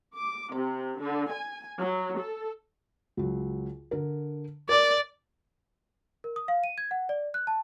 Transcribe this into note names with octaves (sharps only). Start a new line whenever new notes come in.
D6
C3
D3
G#5
F#3
A4
C#2 F#3
D3 A#4
A#4 D5 D6
A#4
D#6
F5
D#7
G#6
F#5
D5
F#6
A5